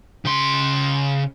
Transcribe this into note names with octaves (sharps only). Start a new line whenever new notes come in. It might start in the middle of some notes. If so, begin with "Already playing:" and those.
C#3 C6